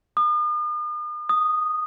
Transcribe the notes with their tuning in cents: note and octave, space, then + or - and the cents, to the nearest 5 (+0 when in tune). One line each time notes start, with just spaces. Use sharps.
D#6 -45
D#6 -10